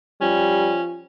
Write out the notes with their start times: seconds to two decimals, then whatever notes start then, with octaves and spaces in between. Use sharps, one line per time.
0.21 F3 G3 C#4